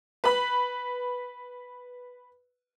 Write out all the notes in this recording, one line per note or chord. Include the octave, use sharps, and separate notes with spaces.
B4 B5